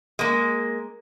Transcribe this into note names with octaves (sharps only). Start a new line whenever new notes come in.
G#3 A#3